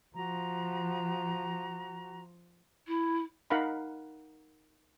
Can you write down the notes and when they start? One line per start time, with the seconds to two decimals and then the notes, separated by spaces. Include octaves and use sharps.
0.16 F3 F#4 A#5
2.87 E4
3.50 D#4 A#4 F5 F#5 B5